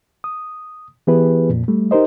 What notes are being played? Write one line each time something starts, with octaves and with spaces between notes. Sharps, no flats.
D#6
E3 B3 E4 G4 G#4 B4
F2 A#2
G3 A3
D#4 G4 A#4 C5 D#5